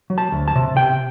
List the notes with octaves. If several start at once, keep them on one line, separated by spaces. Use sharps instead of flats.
F#3
A5
D2
A5
C3
C3 G5